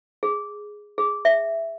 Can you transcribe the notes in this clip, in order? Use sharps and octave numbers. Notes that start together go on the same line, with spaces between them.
G#4
G#4
E5